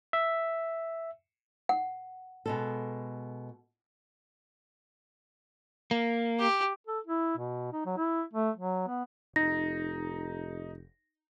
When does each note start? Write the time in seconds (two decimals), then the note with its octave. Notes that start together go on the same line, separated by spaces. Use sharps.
0.13 E5
1.69 F#5
2.46 B2 G#3 A4
5.91 A#3
6.40 G4
6.87 A4
7.07 E4
7.37 B2
7.73 D#4
7.86 F#3
7.97 E4
8.33 A3
8.56 F#3
8.87 B3
9.36 F1 D#4 A#6